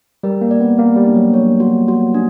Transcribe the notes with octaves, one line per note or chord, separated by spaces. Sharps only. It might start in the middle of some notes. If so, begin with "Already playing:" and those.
G3 A#4
A#3
D5
B3
A#3 D5
G3
D4
F#3
C#5
F#4
F#4
D4